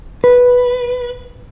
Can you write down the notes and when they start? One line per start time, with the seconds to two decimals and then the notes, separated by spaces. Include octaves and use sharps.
0.24 B4